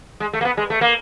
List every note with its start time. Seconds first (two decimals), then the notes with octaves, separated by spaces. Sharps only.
0.20 G#3
0.33 A3
0.41 A#3
0.45 B3
0.57 G#3
0.70 A3
0.81 A#3